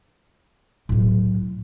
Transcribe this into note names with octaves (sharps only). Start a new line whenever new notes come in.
A2 F#3